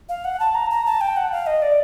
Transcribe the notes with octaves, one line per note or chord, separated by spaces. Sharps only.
F5
F#5
A5
A#5
A#5
A5
G5
F#5
F5
D#5
D5